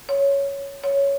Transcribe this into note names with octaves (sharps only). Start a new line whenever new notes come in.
C#5
C#5